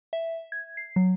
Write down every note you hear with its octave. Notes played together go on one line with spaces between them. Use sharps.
E5
G#6
C7
F#3